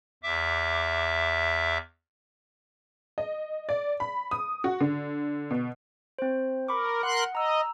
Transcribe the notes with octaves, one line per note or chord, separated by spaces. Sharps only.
E2 E5 D6
D#5
D5
B5
D#6
F#4
D3
B2
C4 C5
A#4 B5 C#6 D6
A#4 F#5 C6 F#6
D#5 A#5 E6